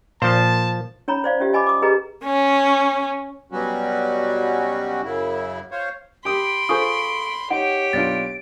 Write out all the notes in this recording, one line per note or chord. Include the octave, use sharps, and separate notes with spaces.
A#2 F3 C5 A5
C#4 C#5 A#5 B5
C5 D5 F5
C#4 F4 G4 E5
D#5 G#5 B5 D6
D6 D#6
G4 G#4 B4 D#5 A#5
C#4
B2 F#3 G3 C#4 F#4
F#2 C#3 E4
F4 C5 C#5
G4 B5 C6 D#6 D7
F4 G#4 A4 C5 C#6 D#6
D#4 G4 C#5 F#5 D7
B1 D4 F4 A6